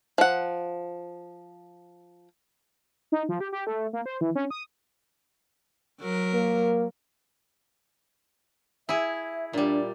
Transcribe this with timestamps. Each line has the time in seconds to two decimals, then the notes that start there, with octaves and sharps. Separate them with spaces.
0.18 F3 F#5
3.12 D#4
3.29 F3
3.41 G4
3.52 G4
3.67 A3
3.93 A#3
4.06 C5
4.21 E3
4.35 C#4
4.51 D#6
6.00 F#3 A#4
6.34 A#3
8.89 E4 G#4 E5
9.53 A#2 G3 D4